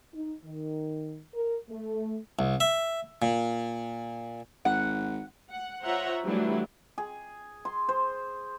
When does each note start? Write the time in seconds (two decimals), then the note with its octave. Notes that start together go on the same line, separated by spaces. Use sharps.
0.14 D#4
0.45 D#3
1.34 A#4
1.70 A3
2.39 C2
2.60 E5
3.22 A#2
4.65 G#1 F#5
5.50 F#5
5.84 F4 C5 C#5 E5 F#5 A#5
6.25 E3 F#3 G3 A3 D4 E4
6.98 G#4
7.65 C6
7.89 C5